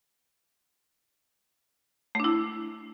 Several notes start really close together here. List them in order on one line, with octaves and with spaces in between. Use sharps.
A3 D4 E4